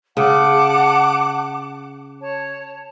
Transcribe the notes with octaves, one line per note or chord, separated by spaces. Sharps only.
C#3 F#5 A5 D6
C#5 A5